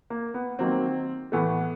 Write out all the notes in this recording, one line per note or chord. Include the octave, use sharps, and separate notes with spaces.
A#3
B3
D#3 F#3 A#3 C4
A2 E3 A3 B3